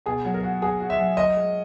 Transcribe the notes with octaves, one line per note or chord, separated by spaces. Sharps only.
B2 G#4
F#3
A#4
F#4
F#4 G#4
F#4
E5
F#3
A#4 D#5
G#3